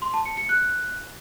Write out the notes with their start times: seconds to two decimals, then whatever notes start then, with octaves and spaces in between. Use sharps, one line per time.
0.02 C6
0.14 A5
0.25 C#7
0.37 C#7
0.49 F#6